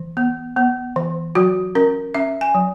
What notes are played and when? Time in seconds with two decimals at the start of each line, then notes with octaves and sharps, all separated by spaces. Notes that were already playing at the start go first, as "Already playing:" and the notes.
Already playing: E3
0.17 B3
0.57 B3
0.96 E3
1.35 F#3 F#4
1.75 C#4 A#4
2.14 C#4 E5
2.41 G#5
2.55 F#3